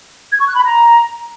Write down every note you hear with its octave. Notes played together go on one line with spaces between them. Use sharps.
G#6
C#6
F#6
B5
A#5